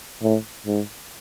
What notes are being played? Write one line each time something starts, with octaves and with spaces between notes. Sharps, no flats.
A2
G#2